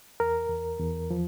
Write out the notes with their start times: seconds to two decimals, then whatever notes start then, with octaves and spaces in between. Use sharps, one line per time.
0.20 E2 A#4
0.49 E2
0.79 E2
1.11 F3